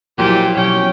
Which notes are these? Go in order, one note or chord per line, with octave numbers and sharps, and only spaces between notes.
A#2 F3 F#3 E4 G4
B2 F#3 C#4 G5